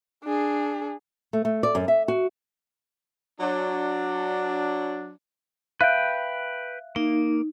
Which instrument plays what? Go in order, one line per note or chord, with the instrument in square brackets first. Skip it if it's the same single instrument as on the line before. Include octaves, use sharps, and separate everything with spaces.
[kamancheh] D4 G#4
[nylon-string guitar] A3
A3
D5
F#2
E5
F#4
[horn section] F#3 D4
[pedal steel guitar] B4 G5 [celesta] E5 F5 F#6
[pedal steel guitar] A#3 [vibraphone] D#4